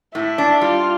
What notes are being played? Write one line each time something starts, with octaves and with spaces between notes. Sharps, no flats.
A2 E4
D4
G3 F4